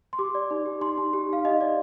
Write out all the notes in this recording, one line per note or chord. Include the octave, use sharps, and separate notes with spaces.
C6
G4 D6
D5
D#4
G4
D#4 C6
D#4
G4
D#4 F5
D#4 D#5
D5